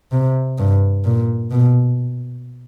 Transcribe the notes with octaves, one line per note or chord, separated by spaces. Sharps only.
C3
G2
A#2
B2